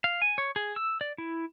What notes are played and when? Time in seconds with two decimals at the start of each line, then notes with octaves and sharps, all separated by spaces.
0.04 F5
0.22 G#5
0.38 C#5
0.56 G#4
0.76 E6
1.01 D5
1.18 E4